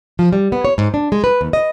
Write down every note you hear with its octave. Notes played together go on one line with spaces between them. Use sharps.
F3
G3
B3
C#5
G#2
D4
G#3
B4
D#2
D#5